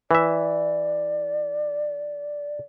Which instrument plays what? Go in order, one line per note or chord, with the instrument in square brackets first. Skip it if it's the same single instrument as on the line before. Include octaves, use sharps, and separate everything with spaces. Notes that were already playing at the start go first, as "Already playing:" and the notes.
[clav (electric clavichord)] E3 E5 [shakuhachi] D5